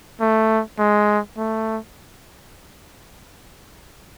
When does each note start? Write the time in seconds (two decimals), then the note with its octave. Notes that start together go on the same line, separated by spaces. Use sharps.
0.21 A3
0.79 G#3
1.38 A3